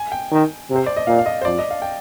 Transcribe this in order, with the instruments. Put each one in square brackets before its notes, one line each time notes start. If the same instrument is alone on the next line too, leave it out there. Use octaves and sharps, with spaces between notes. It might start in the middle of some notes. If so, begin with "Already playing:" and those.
Already playing: [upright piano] G#5
G5
[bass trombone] D#3
C3
[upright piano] C5
D5
D#5
[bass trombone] A#2 [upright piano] F5
[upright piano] F5
D#5
C5
[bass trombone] F2 [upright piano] D5
[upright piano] D#5
F5
G5